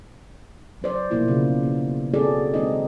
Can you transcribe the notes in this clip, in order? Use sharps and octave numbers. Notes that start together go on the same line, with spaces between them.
F#3 C#4 C5 D5
B2 F3 A#3 E4 F4
C#3
B3
C4 C#4 F#4 G#4 A4 D5
D#3 G#3 C4 D#4 D#5